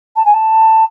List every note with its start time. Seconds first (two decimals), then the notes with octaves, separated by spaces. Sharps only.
0.16 A5
0.26 G#5
0.34 A5